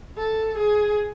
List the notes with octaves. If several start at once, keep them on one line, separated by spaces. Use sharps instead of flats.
A4
G#4